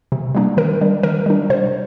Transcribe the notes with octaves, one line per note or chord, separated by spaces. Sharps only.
C3
G3 A#3 D4
D#3 A#4
G3 D4
D#3 A#4
G3 D4
C3 C5